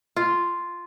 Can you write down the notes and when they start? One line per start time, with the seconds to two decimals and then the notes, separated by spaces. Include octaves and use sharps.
0.16 F4